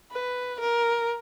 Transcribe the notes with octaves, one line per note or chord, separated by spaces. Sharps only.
B4
A#4